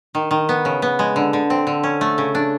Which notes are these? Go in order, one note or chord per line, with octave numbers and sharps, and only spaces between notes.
D#3
D#3
B3
C#3
B3
G#3
D3
D3
C4
D3
C#4
A3
C#3
D4